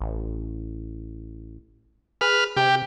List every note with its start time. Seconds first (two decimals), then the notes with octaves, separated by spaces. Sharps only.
0.01 A1
2.21 G#4 B4 F6
2.57 C3 G4